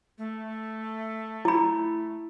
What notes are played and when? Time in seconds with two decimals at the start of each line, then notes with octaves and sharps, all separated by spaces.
0.18 A3
1.45 E4 B5